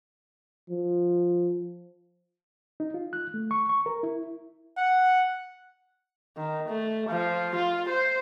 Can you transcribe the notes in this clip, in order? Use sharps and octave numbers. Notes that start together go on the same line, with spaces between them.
F3
D#4
F4
F#6
A3
C#6
C#6
A#4
E4
F#5
D#3
A3
F3
F4
C5